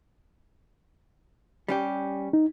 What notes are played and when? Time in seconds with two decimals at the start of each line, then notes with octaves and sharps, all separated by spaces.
1.68 G3 C#4 G4
2.33 D#4